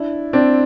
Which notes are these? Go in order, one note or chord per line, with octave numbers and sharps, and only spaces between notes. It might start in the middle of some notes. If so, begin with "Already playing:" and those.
Already playing: D4 E4
C4 D4